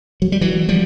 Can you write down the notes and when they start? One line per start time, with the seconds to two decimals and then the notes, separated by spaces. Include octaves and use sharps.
0.22 F#3
0.32 G3
0.41 E3 F#3
0.69 F3 G3